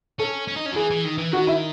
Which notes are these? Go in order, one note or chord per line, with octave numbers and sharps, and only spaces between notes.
C#4 A4
C#4
D#4
C#4
F#3
E3 G#4
E3
D#3
E3
D#3 F#4
E4